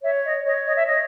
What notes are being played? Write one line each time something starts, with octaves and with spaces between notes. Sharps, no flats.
C#5 E5
D#5
C#5 D#5
D#5
E5
C#5 D#5